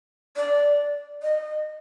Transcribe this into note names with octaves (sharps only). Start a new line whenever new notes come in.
D5
D#5